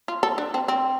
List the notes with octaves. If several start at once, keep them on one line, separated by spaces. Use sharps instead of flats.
F4
A4
D4
C4
C4